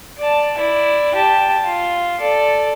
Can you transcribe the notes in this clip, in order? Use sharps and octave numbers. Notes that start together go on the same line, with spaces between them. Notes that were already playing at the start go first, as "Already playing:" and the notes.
D5 A5
E4 D5
G4 A5
F4
A4 D5